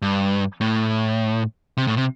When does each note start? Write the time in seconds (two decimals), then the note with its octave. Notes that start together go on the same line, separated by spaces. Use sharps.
0.02 G2
0.61 A2
1.77 C3
1.87 A2
1.97 C3